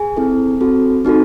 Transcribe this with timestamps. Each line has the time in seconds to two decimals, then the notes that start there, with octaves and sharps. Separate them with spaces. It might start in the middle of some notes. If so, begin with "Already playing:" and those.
Already playing: G#4 G#5
0.17 C4 E4 A4
0.61 C4 F#4 A4
1.05 C4 D#4 F#4 A4